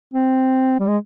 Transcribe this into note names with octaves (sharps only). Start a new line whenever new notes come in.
C4
G3
G#3